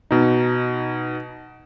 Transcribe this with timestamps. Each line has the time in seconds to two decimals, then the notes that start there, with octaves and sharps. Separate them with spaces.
0.11 B2 D#4